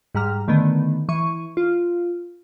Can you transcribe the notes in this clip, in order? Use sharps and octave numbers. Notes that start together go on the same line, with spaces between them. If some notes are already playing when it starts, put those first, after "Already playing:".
G#2 G3 A#5 F6
D3 D#3 A3 B3
E3 C#6 D#7
F4